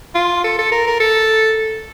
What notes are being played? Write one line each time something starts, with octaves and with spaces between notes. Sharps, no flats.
F4
A4
A4
A#4
A#4
A4